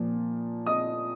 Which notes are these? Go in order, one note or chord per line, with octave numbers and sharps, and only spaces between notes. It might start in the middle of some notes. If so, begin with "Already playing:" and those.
Already playing: A#2 F3
D#5 D#6